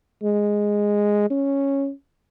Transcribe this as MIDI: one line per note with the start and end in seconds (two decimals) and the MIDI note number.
0.23 1.27 56
1.30 1.90 61